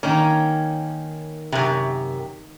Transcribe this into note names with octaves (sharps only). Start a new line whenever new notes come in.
D#3 A#3 C#4
F#2 C3